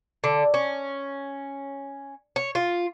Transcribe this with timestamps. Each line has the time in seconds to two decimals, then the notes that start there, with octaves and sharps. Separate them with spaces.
0.24 D3
0.54 C#4
2.36 C#5
2.55 F4